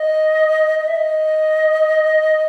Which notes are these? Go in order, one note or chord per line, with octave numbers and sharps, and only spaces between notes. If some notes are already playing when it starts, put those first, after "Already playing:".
Already playing: D#5
D#5
E5
D#5